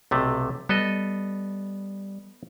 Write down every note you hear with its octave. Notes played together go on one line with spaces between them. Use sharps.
B1 C3 A3
G3 B3 A4 D#5